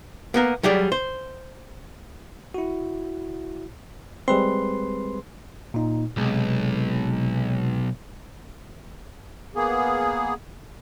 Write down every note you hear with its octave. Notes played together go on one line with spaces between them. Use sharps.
A#3 B3 A#4
F#3 G3 G#4 D5
C5
E4 F#4
G3 G#3 C4 G#4 B4 C6
A#2 D#4
B1 C3 G#3
A#3 B3 G#4